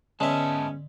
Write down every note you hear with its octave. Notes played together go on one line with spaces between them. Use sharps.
G#2 D3 G#3 B3 C#4 E5 A5